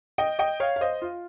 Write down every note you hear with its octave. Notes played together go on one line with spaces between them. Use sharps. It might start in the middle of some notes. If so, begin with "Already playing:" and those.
D#5 G5
D#5 G5
C#5 F5
F5
C5 D#5
F4